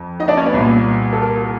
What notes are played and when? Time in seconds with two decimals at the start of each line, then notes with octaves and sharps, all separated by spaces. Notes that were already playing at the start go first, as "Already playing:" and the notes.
Already playing: F2
0.20 D#4 D#5
0.28 D4 D5
0.37 C#4 C#5
0.46 B3 B4
0.54 C2 A#2
1.13 A4
1.22 A#4